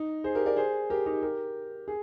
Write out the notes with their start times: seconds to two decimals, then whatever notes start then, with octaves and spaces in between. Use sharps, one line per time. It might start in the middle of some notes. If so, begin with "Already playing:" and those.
Already playing: D#4
0.24 G#4 C5
0.35 G4 A#4
0.46 A#4 D5
0.56 G#4 C5
0.90 G4 A#4
1.06 D#4 G4
1.22 G4 A#4
1.88 G#4